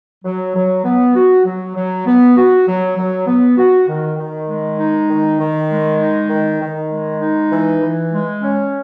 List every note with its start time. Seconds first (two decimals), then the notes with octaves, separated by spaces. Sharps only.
0.24 F#3
0.54 F#3
0.84 B3
1.15 F#4
1.45 F#3
1.75 F#3
2.06 B3
2.36 F#4
2.66 F#3
2.97 F#3
3.27 B3
3.57 F#4
3.88 D#3
4.17 D#3
4.48 G#3
4.78 D#4
5.08 D#3
5.39 D#3
5.69 G#3
5.99 D#4
6.30 D#3
6.59 D#3
6.90 G#3
7.20 D#4
7.50 E3
7.81 E3
8.11 G#3
8.41 C#4